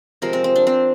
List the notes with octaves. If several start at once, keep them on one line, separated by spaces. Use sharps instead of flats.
C3 F3 G#3 A#4
C4
C4
D4
C4